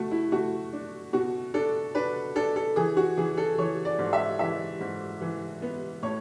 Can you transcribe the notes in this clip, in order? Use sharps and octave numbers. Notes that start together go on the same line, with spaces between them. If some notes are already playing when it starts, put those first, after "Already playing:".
Already playing: B2 A3 F#4
E4
A3 F#4
D4
B2 F#4
D4 A4
D4 B4
D4 A4
A4
E3 G#4
F#4
E3 G#4
A4
E3 C#5
D5
G#2
E5
E3 E5
G#2
E3
B3
A2 C#5